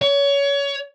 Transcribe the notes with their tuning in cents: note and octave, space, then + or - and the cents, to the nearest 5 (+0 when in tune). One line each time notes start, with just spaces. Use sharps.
C#5 +25